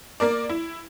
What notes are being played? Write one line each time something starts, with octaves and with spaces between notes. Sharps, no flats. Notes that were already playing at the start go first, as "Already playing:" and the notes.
A#3 A#4 D5
E4